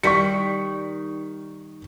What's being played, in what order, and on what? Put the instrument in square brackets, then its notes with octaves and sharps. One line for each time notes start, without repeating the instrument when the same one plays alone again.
[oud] D#3 G3 [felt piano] C#6 B6 C#7